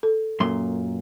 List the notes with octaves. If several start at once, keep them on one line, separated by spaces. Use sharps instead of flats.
A4
F#2 A#2 C6